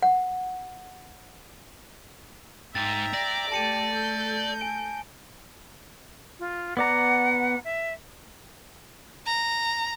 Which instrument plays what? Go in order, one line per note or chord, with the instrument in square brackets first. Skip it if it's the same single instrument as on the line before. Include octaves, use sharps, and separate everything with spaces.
[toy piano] F#5
[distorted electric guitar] G#2 [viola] E5 A#5 [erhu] G5 [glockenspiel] A6
[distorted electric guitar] D5 [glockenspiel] A#6
[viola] A3 A4 [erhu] G4 [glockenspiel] A5 C#7 D#7
[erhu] G6
[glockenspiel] G#5 D7
[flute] F4
[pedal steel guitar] B3 D5 A#5 [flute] F#5
[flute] E5
[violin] A#5